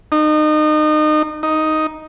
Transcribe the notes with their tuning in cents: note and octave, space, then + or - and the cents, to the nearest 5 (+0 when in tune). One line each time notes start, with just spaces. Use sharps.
D#4 -30
D#4 +5